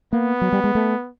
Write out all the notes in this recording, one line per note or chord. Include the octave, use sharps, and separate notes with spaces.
A#3 B3
F#3
G3
G#3
A3